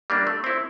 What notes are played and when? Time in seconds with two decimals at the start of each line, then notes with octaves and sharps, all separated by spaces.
0.10 G3 A#3 D4
0.27 A3
0.44 C4 E4